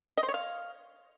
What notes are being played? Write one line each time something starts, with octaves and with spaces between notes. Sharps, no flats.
D#5
C5
C#5
F5